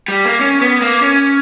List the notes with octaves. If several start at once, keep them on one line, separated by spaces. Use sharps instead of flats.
G3
A#3
C#4
B3
A#3
C#4